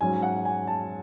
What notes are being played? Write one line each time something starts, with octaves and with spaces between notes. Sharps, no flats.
G#2 F#3 C#4 G#5
F#5
G#5
A5